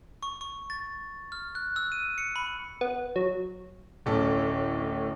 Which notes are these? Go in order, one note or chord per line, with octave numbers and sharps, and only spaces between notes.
C#6
C#6
A6
F6
F#6
E6
D#7
C#7
B5
B3
F#3
D1 A2 C#4 A4